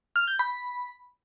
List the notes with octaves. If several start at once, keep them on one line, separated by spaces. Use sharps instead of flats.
F6
G6
B5